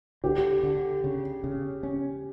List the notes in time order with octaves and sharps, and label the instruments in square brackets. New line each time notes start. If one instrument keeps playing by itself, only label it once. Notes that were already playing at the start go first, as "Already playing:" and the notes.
[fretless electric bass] D3 [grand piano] G4
[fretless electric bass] D3
C#3
C#3
C#4